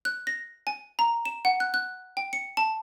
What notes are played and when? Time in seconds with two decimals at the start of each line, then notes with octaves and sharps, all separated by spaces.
0.05 F#6
0.27 A#6
0.67 G#5
0.99 A#5
1.25 E7
1.45 F#5
1.60 F#6
1.74 F#6
2.17 G5
2.33 C#7
2.57 A5